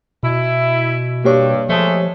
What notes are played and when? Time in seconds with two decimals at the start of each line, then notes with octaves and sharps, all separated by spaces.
0.23 B2 E4
1.25 G2 A#3 G4 C#5
1.69 F3 G#3 A3